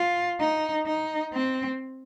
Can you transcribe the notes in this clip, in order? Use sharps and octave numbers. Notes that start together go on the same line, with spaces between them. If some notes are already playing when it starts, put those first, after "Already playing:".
Already playing: F4
D#4
D#4
C4